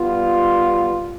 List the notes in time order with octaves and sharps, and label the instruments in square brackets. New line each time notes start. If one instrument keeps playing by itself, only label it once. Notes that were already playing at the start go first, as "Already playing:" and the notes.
Already playing: [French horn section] G3 B3 F4